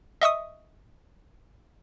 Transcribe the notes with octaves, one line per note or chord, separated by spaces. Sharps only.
D#5 E5 C#6 D#6